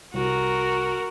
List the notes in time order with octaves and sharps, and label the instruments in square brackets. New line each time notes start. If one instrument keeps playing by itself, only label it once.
[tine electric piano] C2 [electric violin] F#4 A#4